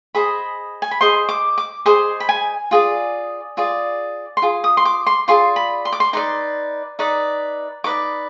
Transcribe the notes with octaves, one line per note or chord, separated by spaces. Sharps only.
G#4 C5 D#5 B5
G#5
B5
G#4 C5 D#5 C6
D6
D6
G#4 C5 D#5 C6
B5
G#5
F4 G#4 D5
F4 G#4 D5
C6
F4 G#4
D#6
C6
D6
C6
F4 G#4 D5 C6
B5
C6
D6
C6
D#4 B4 D5 C6
D#4 B4 D5
D#4 B4 D5 D6